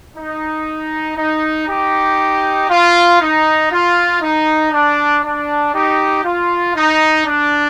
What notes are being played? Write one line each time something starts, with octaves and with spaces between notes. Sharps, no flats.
D#4
D#4
D#4 G4
F4
D#4
F4
D#4
D4
D4
D#4 G4
F4
D#4
D4